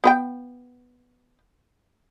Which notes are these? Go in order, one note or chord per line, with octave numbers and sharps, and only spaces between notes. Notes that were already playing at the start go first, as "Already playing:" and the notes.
B3 B4 G5